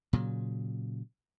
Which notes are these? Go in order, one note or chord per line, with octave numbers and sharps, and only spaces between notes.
A#2 C#3 F#3